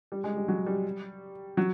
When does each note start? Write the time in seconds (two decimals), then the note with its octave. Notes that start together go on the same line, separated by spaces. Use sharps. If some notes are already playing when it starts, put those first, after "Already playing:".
0.12 G3
0.24 G#3
0.36 G3
0.48 F#3
0.66 G3
1.57 F#3